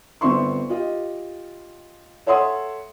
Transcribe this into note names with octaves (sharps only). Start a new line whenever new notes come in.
G1 B3 C4 E5 C6 C#6
F4 G4 D#5
A4 C#5 E5 F#5 C6 D#6